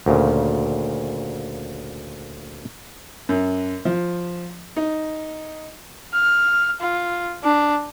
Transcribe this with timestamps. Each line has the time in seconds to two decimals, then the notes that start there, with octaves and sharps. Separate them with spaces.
0.06 D2 A#2 C#3
3.29 F#2
3.85 F3
4.76 D#4
6.14 F6
6.81 F4
7.44 D4